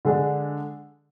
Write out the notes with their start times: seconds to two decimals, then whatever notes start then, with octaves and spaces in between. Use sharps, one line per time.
0.05 D3 G#3 D4